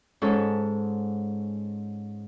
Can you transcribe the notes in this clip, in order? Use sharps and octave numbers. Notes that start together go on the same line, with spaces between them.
G#2 C#4 A4